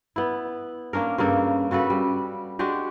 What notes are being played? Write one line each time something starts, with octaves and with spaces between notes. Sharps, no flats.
B3 E4
A#3 C#4 D4 A#4
G2 C#3 A#3 A4
C#3 F#4 A4 B4
G3
G#3 D4 F#4 G4